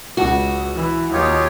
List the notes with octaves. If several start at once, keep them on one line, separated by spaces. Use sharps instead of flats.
C#2 F#4
E3
D#2 D#4 F4 G4 C#5